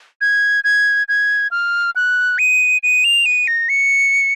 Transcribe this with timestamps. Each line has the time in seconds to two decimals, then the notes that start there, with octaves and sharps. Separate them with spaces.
0.21 G#6
0.64 G#6
1.08 G#6
1.51 F6
1.96 F#6
2.38 D#7
2.83 D#7
3.04 F7
3.26 D#7
3.47 A#6
3.69 C#7